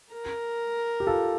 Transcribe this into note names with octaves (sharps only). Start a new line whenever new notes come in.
A#4
G4
F4 A4